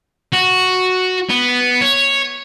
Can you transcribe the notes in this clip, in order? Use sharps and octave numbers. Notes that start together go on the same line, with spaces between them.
F#4
B3
C#5